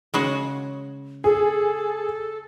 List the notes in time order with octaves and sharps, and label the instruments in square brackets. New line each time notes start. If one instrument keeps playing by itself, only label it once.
[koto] C#3 G#3 F#4
[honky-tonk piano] G#4 [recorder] A4